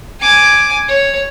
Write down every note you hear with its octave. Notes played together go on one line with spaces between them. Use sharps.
G#5 D6
C#5